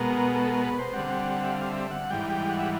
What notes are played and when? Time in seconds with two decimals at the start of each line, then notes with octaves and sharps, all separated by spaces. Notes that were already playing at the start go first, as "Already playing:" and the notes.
Already playing: B2 G#3 B3 A#4
0.34 A4
0.50 A#4
0.64 B4
0.79 C5
0.93 D3 G3 C4 F#5
1.43 E5
1.51 F5
1.71 E5
1.91 F#5
2.10 G#2 E3 G3 G5
2.29 G5
2.49 F#5
2.59 E5